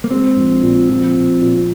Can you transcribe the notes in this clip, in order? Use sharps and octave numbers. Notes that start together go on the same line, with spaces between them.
A#3
G#3 C4
A#1
A#2
F3
A#2
A#2